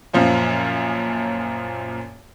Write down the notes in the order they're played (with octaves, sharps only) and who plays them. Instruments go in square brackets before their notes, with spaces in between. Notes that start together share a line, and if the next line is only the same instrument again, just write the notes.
[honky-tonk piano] F#2 A#2 F3 C#4 F4